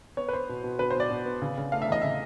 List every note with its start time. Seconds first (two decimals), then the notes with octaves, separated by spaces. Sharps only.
0.17 B3 C#5
0.29 B4
0.33 B3 C5
0.49 B2
0.64 B2
0.79 B2 B4
0.90 C5
0.95 B2 D5
1.10 B2
1.25 B3
1.42 C#3
1.58 C#3
1.72 A3 F5
1.82 E5
1.89 E2 D#5
2.02 C#3 E5